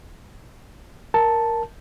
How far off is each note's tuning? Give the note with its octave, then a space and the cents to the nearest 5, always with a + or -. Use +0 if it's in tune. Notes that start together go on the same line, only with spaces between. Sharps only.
A#4 +0 A5 +0